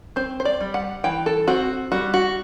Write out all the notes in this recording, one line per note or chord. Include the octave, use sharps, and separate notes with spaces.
C4 C5
C5
D5
G3
F#5
E3 G5
A4
C4 F#4
G3 F#4
F#4